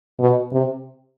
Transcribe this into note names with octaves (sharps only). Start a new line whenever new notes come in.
B2
C3